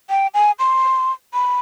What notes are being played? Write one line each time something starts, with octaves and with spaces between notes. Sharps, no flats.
G5
G#5
C6
B5